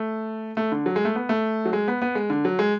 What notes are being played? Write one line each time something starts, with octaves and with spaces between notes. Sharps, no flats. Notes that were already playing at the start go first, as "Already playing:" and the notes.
Already playing: A3
A3
D3
F#3
G#3
A3
B3
A3
F#3
G#3
B3
B3
G#3
D3
F#3
G#3